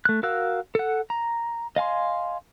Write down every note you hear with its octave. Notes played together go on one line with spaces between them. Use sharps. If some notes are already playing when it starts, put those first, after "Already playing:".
A3 F#6
F#4 A#4 F5 E6 F#6
A4 F#5
A#5
D#5 F5 G#5 C6